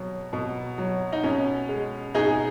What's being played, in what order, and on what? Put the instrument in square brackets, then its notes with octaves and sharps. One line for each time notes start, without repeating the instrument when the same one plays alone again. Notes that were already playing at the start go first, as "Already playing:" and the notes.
Already playing: [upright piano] B2 F#3
B2
F#3
D#4
B2 C#4
G#3
B2 D#4 G#4